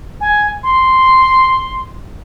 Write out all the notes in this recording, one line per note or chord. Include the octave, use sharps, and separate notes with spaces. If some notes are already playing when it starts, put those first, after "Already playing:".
G#5
C6